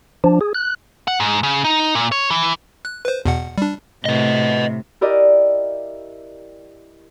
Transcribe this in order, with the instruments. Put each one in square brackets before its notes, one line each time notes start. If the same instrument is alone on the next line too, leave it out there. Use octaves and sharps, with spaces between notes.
[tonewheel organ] F3 D4
G#4
F#6
[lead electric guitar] F#5
G#2
C#3
D#4
A#2
C#5
E3
[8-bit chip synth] F#6
B4 C5
E2 B2 F#5
G3 D4
[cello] A2 C3 [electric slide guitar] B4 D#5
[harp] E4 G4 A#4 D5 D#5